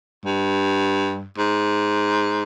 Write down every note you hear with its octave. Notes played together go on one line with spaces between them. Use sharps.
G2
G#2